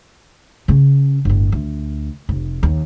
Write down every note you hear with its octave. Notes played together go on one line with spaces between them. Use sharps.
C#3 C#4
G1 A2
D2
F1
D#2